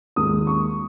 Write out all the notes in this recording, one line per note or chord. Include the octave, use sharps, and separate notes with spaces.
D#2 D#3 G#3 D#6
C#6